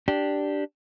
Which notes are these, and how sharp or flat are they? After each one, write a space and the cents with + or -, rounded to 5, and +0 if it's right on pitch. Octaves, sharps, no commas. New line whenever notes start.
D4 +0 G4 -5